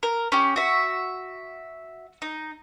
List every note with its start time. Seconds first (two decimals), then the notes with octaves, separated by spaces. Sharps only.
0.03 A#4
0.32 C#4 G4
0.56 F#4 E5
2.22 D#4